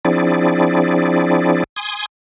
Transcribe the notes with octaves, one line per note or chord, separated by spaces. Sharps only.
F3 C4 D4 E4 G#4 D5
G#5 C6 D#6 G#6